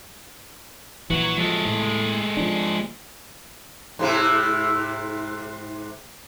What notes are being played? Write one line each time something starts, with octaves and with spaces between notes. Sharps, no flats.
A#1 E3 F#4 C#5
F3 F#3 G#3 A4
A2
F3 D4
G#2 C3 E4